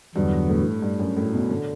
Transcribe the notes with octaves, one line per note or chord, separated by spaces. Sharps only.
E2 G2 D3 F#3 B3
A2
G2
F#2
A2
B2
D3